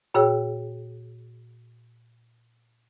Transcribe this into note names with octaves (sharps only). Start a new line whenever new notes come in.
A#2 F#4 G#4 C#5 G5 E6